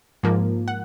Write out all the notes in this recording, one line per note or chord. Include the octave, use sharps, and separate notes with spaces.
G#2 F3 A#3
F#5